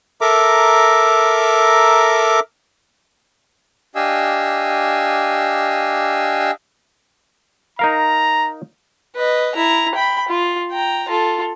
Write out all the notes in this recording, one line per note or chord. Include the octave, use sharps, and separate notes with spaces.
A4 A#4 E5 A#5 D6
D4 G4 D#5 F5 G#5 E6
D#4 A#4 F5 A#5
B4 D#5
E4 A#5
G5 B5
F4
G5 A#5
F4 A4